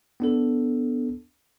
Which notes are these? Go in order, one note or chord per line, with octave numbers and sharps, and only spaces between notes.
B3 D4 A4